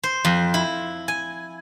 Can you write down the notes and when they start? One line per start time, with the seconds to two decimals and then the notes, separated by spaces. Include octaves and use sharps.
0.03 C5
0.25 F2
0.54 E4
1.08 G#5